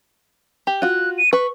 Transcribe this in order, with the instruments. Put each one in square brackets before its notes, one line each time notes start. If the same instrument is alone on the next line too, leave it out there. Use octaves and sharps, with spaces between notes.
[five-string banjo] G4
[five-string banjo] F4 F#4 [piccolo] F#6
[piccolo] D#7
[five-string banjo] B4 [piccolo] C#6